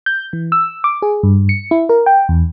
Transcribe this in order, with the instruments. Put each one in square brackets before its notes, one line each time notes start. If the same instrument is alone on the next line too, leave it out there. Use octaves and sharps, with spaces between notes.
[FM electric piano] G6
E3
E6
D6
G#4
G2
C#7
E4
A#4
G5
E2